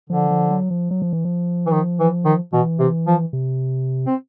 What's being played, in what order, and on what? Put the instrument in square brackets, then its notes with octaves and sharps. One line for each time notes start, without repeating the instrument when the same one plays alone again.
[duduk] D3 [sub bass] F3
[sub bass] F3
F#3
F3
F#3
F3
E3
F3
[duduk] E3
D#3
E3
D#3
[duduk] B2 [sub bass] E3
[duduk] C3
F3
[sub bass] C3
[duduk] C4